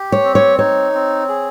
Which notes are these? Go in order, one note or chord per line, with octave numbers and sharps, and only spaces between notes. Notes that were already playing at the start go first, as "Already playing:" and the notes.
Already playing: G4
C#5
C4
C#5
D#4 C#5
C4
G#4